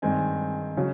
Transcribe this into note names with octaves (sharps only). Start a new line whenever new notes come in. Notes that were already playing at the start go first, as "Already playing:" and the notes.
G2 D#3 G#3 C4 D#4 G#5
C#3 F#3